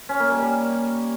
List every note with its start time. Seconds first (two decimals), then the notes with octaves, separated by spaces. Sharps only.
0.09 C#4
0.20 A#3
0.31 G3
0.42 G3